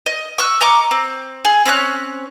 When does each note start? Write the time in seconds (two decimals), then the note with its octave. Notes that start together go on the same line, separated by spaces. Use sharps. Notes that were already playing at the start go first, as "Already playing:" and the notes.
0.06 D#5
0.38 C#6 E6 F#6
0.61 D#5 A#5 C#6 D6
0.91 C4
1.45 G#4
1.65 C4 C#4 C#5 F#6